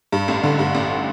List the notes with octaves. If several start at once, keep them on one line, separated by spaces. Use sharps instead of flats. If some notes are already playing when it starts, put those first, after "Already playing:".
G2
A1
D3
G2
A1